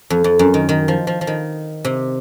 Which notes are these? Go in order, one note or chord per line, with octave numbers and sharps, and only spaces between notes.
F2
F2
F#2
D#3
D#3
F3
F3
F3
D#3
C3